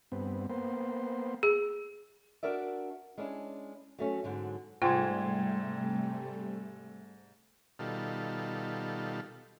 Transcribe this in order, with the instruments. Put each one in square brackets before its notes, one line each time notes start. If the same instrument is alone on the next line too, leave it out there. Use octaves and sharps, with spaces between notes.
[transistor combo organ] G2 B3 C4
A#3 B3 C5
[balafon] G#4
[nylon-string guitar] D4 F#4 A#4 D5 E5
G#3 C#4 D4 E4
F#3 A3 C#4
G#2 D3 F#3
[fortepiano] G#2 [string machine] C3 G3 A3 [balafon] F4 [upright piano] G5 C6 G#6
[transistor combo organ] B2 D#3 G3 F4 A4